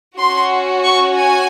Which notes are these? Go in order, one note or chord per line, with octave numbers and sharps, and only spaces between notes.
C#4 F#4 C6
C#6
G#5